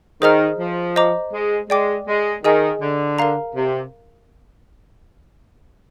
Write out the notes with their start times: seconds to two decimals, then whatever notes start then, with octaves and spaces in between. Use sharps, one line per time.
0.22 D#3 G#4 C5 D#5 A#5 F6
0.59 F3
0.96 C5 D#5 A#5 D6
1.33 G#3
1.70 G#3 D5 G5 D6
2.08 G#3
2.44 D#3 G#4 D#5 G#5
2.82 D3
3.19 A#4 F5 A#5
3.55 C3